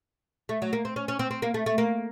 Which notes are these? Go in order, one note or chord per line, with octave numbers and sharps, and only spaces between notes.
A3
F#3
A#3
C4
C#4
C#4
C4
C4
A#3
A3
A3
A#3